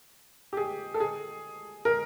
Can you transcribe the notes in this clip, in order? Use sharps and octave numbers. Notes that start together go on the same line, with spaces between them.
G4
G#4
A4
G#4
A#4